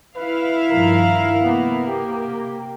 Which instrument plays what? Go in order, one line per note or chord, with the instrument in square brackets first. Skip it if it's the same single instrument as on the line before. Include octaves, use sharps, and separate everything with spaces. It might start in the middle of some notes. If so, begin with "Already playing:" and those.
[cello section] E4 F5 [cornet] B4
[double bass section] G2 D#3 F3 [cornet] A#4
[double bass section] C3 A#3 [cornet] B3
[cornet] G4